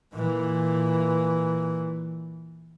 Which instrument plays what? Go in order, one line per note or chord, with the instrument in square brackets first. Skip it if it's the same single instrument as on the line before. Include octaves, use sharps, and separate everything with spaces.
[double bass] A#2 E3